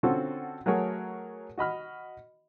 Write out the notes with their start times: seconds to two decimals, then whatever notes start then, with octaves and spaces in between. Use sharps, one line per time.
0.03 D3 C4 C#4 F4 F#4 A4
0.66 F#3 A3 F#4 G#4 A#4 C#5
1.58 F#4 D#5 B5 F6